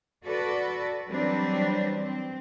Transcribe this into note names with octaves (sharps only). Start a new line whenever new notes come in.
F#4 A4 B4 D5
E3 F#3 G3 C4 D4 B4
C4